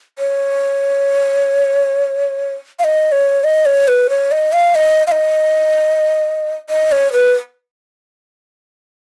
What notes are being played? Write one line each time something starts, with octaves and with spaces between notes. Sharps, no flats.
C#5
F5
D#5
C#5
D#5
C#5
B4
C#5
D#5
F5
D#5
F5
D#5
D#5
C#5
B4